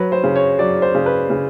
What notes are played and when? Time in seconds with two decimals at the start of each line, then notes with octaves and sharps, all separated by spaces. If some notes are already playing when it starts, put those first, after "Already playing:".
Already playing: F#3 B4
0.12 C5
0.24 C#3
0.36 C#5
0.59 F#3 D5
0.82 C5
0.95 C#3
1.06 B4
1.30 C#3